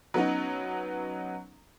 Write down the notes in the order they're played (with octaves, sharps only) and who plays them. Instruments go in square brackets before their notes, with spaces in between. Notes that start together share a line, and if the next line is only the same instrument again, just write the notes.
[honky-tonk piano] F#3 B3 C#4 D#4